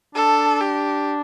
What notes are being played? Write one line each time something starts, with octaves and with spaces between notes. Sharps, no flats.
D4 A4
G4